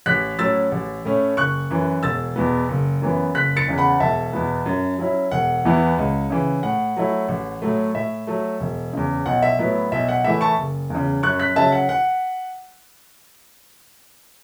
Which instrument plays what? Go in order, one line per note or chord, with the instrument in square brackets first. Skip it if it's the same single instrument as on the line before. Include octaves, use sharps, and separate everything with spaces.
[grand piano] A1 F#6 B6
A2 F#3 C#4 E6 A6
A1
A2 A3 C#4
F#1 C#6 F#6
F#2 E3
E1 E6 A6
E2 B2 B3
F#1
F#2 E3 B3
F#1 F#6 B6
A6 C#7
E2 C#3
F#5 B5
E1 E5 A5
E2 B2 B3
F#2
F#3 C#4 E4
E1 F#5
E2 E3 B3 E4
C#2
C#3 E3
A2 F#5
F#3 A3 E4
A1
A2 F#3 A3
A2 E5
F#3 A3
E1
E2 C#3
B1 F#5
E5
A2 F#3 B3 E4
B1 E5
F#5
A2 E3 A3 E4 E5
A5 C#6
F#1
E2 C#3
F#2 C#6 F#6
F#6 B6
C#3 F#3 E5 A5
F#5
F#5